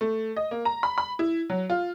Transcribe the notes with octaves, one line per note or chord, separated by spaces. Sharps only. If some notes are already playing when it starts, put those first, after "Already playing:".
A3
D#5
A#3
A#5
B5
B5
E4
F#3
F4